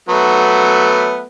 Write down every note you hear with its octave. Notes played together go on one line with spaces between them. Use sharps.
F#3 A3 B3